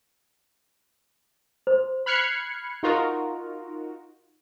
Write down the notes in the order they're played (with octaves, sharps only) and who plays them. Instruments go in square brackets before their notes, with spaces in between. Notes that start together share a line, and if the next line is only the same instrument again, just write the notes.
[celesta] C5
[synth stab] B5 F6 F#6 G#6 C7 C#7
D#4 F4 F#4 A#4